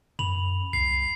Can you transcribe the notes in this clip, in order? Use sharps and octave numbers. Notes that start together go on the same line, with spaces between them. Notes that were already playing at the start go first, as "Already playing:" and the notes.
F#2 B5 F7 F#7
C2 C7